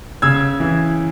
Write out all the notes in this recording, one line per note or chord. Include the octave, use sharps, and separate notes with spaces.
C#3 E6 G#6
E3